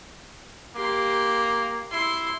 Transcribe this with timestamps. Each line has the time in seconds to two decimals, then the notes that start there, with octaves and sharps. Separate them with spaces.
0.76 A#3 G4 C6
1.91 E4 C6